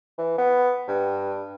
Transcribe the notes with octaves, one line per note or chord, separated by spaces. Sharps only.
E3
B3
G2